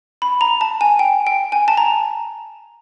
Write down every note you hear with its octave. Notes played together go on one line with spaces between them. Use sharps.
B5
A#5
A5
G#5
G5
G5
G#5
A5
A#5